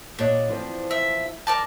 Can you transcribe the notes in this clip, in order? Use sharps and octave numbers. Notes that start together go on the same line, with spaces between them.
A#2 D4 C#5 D#5
E3 F3 C4
E5
A#4 D5 A5